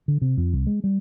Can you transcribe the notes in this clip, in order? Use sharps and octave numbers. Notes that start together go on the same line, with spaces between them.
D3
C3
F2
C2
G#3
G3